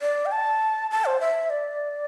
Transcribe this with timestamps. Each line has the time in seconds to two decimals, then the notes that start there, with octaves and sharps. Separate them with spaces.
0.02 D5
0.26 G5
0.32 A5
0.91 A5
1.05 C5
1.20 E5
1.50 D5